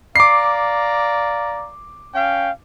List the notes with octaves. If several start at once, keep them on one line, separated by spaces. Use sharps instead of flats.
D5 F5 A#5 D6 C7
C#4 F5 G5